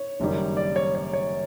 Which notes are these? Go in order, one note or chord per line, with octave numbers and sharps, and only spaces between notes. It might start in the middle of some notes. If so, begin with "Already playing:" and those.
Already playing: C#5
F#1 F#2 D#3 G3
D5
C#5
C#5
C#5